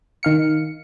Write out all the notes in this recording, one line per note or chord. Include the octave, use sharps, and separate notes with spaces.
D#3 F5 C#7